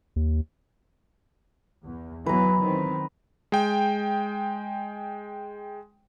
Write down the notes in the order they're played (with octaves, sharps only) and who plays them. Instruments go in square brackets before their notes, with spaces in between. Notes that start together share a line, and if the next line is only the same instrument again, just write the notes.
[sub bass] D#2
[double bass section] E2
[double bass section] E3 F#3 B3 [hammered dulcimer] B4 A#5
[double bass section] D#3 C4
[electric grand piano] G#3 G5